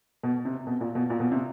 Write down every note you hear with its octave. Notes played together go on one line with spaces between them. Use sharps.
B2
C3
B2
A#2
B2
A#2
B2
C3